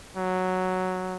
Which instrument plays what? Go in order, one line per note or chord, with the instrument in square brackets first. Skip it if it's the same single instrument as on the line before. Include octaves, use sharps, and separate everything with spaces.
[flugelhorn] F#3